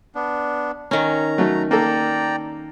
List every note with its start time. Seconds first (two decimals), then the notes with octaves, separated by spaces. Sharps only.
0.15 B3 D4
0.91 D#3 C#4 A#5
1.38 F#3 A3
1.71 A#3 A4 D5 G5 A#5